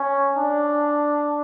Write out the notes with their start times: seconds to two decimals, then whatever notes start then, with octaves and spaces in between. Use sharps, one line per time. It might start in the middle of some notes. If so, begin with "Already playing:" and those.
Already playing: C#4
0.37 D4